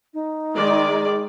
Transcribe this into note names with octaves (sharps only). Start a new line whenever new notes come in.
D#4
D#3 G#3 D5